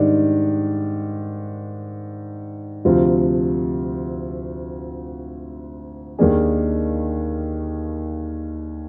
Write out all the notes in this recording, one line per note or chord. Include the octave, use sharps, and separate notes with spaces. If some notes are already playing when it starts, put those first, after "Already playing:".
Already playing: G#2 D#3 G3 D4
D2 C3 F3 C4 F4
D#2 D#3 A#3 D4 G#4